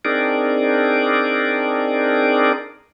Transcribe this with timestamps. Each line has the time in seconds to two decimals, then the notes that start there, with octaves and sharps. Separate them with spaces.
0.05 C4 D4 D#4 G#4 A#4 D5